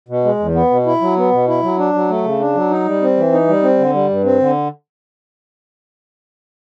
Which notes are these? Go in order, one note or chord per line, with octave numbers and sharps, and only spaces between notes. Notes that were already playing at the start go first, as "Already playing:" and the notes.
B2
G#3
E2
B3
B2
E4
F#3
B3
B2
E4
F#3
D4
F#3
A3
C#3
D4
F#3
D#4
G3
C4
E3
D#4
G3
C4
D3
G3
G2
C4
D3